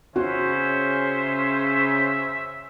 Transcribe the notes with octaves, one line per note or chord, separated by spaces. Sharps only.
C#3 C#4 F#4 C5 E5